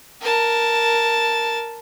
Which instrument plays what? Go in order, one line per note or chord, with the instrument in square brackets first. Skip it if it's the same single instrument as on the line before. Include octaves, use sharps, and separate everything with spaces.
[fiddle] A#4 A5